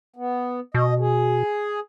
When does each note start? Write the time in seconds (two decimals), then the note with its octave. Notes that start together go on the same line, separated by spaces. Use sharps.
0.16 B3
0.74 B2 D#5
1.00 G#4